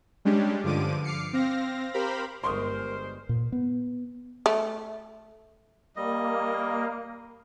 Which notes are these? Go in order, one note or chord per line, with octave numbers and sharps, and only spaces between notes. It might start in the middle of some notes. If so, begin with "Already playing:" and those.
G3 G#3 C#4 D4 G4
G2 D3 F3 D6 D#7
D6 F6 C7 C#7
C4 F5 A#6
G4 A#4 C5 F5 A#5 B5
G1 G3 G#3 A#4 C5 C6 C#6 D#6
A#2
B3
A3
G3 A#3 D#5